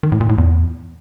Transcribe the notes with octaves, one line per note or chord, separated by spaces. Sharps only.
D#3
A2
A#2
A2
E2